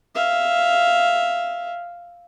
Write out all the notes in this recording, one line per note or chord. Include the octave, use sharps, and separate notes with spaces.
E5 F5